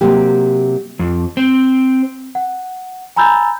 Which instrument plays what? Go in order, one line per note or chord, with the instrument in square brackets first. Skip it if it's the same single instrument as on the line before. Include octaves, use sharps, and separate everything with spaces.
[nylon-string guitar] C3 F#3 A#3 G4
[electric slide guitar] F2
C4
[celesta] F#5
G#5 A#5 B5 E6 G6 A6